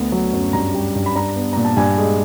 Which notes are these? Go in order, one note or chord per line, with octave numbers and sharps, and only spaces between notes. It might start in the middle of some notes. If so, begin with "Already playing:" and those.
Already playing: D2 B3
F#3
F#2
G2 A#5
G3
G2
B5
D4 A#5
B3
A#2 A#5
A5
G2 G#5
G#3